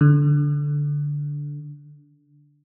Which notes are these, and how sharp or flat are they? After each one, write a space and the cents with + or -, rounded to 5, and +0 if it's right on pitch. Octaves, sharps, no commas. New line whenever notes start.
D3 -10